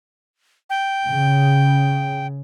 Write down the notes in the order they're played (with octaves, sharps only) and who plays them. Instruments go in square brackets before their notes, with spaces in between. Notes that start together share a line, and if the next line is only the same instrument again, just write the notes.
[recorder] G5
[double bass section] C#3